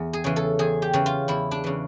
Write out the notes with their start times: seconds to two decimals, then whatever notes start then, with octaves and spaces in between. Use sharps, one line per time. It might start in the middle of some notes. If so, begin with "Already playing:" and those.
Already playing: E2
0.13 G#4
0.24 C#3 E3
0.36 A4
0.59 E2 G#4
0.82 G4
0.93 C#3 E3
1.06 F4
1.28 E2 E4
1.51 D4
1.64 C#3 E3